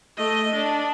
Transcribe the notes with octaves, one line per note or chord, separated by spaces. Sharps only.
A3 D#5
D4